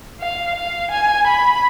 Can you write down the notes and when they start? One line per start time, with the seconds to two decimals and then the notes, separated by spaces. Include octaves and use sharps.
0.20 F5
0.55 F5
0.91 G#5
1.27 B5